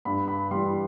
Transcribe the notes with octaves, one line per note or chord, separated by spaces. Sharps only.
G2 B5
B5
E3 G3 C6